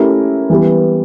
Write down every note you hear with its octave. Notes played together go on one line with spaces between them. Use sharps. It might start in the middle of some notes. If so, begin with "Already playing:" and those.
Already playing: A3 C#4 E4 G4 A#4
E3 G3 B3